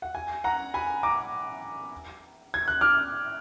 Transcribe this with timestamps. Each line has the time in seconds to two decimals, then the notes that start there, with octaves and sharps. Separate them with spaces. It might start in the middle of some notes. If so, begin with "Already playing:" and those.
0.02 F#5
0.15 G#5
0.44 F#5 A#5
0.74 G#5 B5
1.03 A#5 D6
2.54 G#6
2.68 F#6
2.81 D6 F6